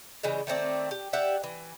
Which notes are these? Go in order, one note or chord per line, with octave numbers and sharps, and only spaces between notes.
C#3 E3 G3 G#3
D#3 A3 C4 D5
G4
G4 D5 E5 F#5
E3